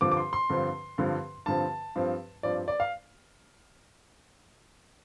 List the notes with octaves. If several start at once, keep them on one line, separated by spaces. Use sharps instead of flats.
G2 D3 F3 C4 D6
D6
C6
C6
G2 D3 F3 C4
G2 D3 F3 C4
G2 D3 F3 C4 A5
G2 F3 C4
G2 F3 C4 D5
D5
F5